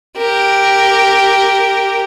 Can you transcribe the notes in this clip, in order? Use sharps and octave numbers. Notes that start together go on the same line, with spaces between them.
G4 A#4